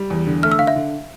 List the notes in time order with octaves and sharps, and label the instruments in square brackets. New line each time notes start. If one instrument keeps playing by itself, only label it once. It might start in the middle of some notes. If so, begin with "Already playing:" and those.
Already playing: [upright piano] G3
E2
D3
[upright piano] A3 [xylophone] F6
[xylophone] E6
[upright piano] D3 [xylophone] F5
[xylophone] E5
[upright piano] D3